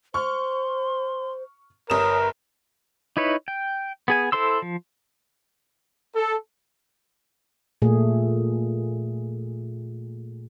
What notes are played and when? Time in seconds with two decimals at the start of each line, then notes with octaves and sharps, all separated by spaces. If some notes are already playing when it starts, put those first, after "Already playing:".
0.14 C5 C6 C#6 F6
1.90 G1 A#4 C#5 D#6 E7
3.17 D#4 E4 B4 C#5
3.48 G5
4.08 B3 G#4 G#5
4.32 E4 A4 C5 C6 E6
4.62 F3
6.16 A4
7.82 A#2 A3 G#4